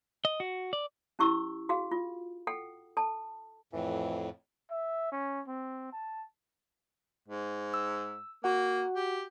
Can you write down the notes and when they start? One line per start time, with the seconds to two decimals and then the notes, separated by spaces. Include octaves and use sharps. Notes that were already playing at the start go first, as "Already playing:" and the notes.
0.25 D#5
0.40 F#4
0.73 D5
1.19 C#4 E4 G4 C#6 E6
1.69 F#4 G#4 F5
1.91 F4
2.47 A4 F#5 G5
2.97 A4 A5
3.73 F2 A2 E3
4.71 E5
5.12 C#4
5.48 C4
5.92 A5
7.28 G#2
7.74 E6
8.44 A#3 F#4 F#5
8.96 G4